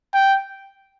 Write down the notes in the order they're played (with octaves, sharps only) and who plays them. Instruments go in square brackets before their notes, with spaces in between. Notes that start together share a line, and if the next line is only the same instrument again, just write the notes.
[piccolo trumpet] G5